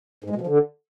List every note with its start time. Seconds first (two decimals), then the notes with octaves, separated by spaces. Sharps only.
0.24 G#2
0.30 G#3
0.36 B2
0.41 F3
0.47 D3